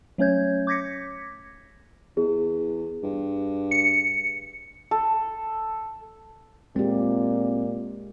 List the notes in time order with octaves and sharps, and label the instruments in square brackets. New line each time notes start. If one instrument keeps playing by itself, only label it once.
[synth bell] F#3 A3 C#4 C#5 G6 G#6
D6 G6 G#6 A#6 B6 C#7
[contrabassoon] E2 [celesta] G#4
[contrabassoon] G2
[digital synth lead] C#7
[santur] A4
[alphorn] A#2 [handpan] G#3 G4 [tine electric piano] C4